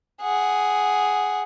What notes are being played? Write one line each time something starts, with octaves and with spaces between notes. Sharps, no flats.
G#4 F#5